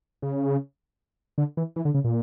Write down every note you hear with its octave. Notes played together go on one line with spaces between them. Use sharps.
C#3
D3
E3
E3
D3
C#3
A#2